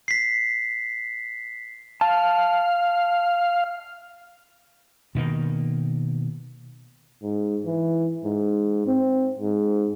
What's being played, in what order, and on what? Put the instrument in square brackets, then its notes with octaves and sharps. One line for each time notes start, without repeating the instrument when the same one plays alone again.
[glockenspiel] B6 C7
[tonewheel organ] F5 [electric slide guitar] A5
[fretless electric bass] B2 D#3 A#3
[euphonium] G#2
E3
G#2
C4
G#2